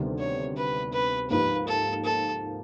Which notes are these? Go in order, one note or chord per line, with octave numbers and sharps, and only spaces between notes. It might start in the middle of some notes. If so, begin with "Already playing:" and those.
Already playing: D2 C3 D#3 G3 B3
C#5
B4
B4
G#2 F3 A#3 D#4 G4 B4
A4
A4